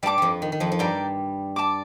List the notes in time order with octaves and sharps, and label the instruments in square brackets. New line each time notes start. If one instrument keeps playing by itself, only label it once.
[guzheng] G2 G3 [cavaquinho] D5 A5 D6
[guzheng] F2 F3 G3
D#3
D#3
F2 F3
F3
[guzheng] G2 G3 [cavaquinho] D5 G5 A#5
[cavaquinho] D5 A5 D6